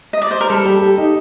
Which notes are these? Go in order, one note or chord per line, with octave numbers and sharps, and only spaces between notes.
D#5
D5
C5
A#4
G3 A4
G4
G4
D#4